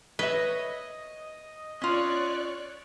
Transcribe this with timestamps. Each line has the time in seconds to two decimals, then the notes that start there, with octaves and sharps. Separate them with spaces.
0.19 B4 C#5 D#5 E5
1.82 C#4 F4 C#5 D5 F#6